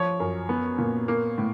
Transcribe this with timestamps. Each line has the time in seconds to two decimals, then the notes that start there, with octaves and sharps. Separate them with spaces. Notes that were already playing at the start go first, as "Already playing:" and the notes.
Already playing: F3 C#5
0.20 F#2
0.49 B3
0.78 A#2
1.08 A#3
1.38 A2